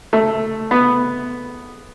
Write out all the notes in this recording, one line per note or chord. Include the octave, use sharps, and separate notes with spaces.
A3
B3